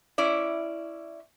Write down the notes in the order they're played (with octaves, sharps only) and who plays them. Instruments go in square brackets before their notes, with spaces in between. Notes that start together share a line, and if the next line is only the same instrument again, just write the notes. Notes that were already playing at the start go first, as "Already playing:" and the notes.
[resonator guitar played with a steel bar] C#4 E4 D5